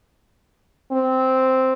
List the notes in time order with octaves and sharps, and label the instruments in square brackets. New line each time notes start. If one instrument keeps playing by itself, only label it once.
[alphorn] C4